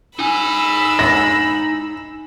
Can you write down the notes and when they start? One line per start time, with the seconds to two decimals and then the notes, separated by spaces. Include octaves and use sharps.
0.19 D#4 G#5 B5 E6
0.99 A#6